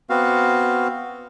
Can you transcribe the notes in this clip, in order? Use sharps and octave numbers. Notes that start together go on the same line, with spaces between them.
B3 C4 F#4 F5